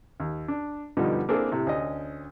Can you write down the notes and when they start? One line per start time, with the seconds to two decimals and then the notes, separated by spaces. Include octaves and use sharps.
0.20 D#2
0.48 D4
0.97 G2 B2 D3 F3 G3 D#4
1.29 A#3 C4 D4 E4 G#4 A4
1.51 A2 C3
1.67 D2 C#4 D#5